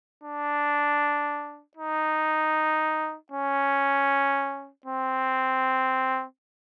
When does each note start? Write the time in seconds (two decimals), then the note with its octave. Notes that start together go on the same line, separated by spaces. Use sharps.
0.24 D4
1.77 D#4
3.32 C#4
4.86 C4